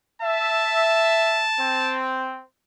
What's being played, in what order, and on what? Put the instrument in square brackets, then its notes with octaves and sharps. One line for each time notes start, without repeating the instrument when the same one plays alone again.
[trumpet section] E5 [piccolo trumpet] A5
[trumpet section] C4